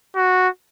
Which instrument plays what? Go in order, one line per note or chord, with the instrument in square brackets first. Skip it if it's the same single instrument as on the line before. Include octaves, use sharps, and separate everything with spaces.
[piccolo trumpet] F#4